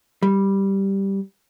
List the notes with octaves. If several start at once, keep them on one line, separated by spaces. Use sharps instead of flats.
G3